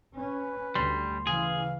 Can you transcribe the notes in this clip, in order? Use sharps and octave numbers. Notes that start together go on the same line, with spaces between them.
C#4 B4
D2 G3 C6
C#3 E3 G#4 F5